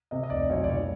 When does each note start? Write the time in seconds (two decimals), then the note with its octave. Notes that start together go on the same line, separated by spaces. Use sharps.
0.11 C3 D#5
0.23 D#5
0.30 F1 D5
0.50 B1 C#5
0.64 D5
0.69 B1 C#5